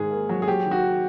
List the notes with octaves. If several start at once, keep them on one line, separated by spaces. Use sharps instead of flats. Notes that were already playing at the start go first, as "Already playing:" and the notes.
Already playing: G#2 D#3 G#4
A#3
F#3
G#4
F#3 G4
D#3
F#4
D#3